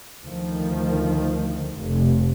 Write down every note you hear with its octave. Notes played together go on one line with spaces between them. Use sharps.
D2 D#3 F3
F1